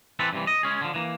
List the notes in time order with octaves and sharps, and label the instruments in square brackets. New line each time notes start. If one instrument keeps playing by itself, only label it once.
[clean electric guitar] E3 C4 A4 B4
G2 C3 E3
D#5
G#3 C#4 G#4
D3 F3
E3 A#3